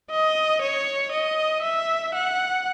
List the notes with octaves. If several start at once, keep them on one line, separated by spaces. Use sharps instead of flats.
D#5
C#5
D#5
E5
F#5